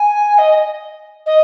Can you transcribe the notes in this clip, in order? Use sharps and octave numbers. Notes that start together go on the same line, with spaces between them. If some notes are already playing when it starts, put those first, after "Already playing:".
Already playing: G#5
D#5
D#5